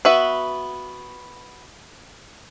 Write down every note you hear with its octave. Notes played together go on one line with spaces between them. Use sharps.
B3 F#4 B4 E5